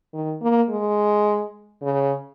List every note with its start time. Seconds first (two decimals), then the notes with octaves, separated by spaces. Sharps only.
0.14 D#3
0.42 A#3
0.69 G#3
1.82 C#3